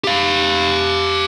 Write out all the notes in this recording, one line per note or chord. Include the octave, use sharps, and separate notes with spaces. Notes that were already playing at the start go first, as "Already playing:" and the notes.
G4 F5